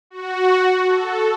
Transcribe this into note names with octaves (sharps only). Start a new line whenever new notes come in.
F#4
A4